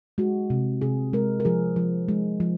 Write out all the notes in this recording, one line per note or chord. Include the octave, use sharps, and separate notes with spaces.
G#3 F#4
C3
C3 G#4
G#3 A#4
A#4
F3 G#4
F3
G#3
F3